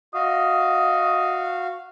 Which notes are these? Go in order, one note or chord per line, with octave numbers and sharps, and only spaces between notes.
F#4 D#5 F5